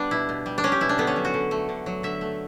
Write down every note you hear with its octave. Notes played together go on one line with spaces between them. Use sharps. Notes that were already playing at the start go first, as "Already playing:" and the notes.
Already playing: G3 B3 D4
B2 E4
B2
G3
D4
G3 C#4
G4
B2 E4
D4
D3 B3
C#4
F#3
F#4
D3
A3
D3
F#3
D3 E5
A3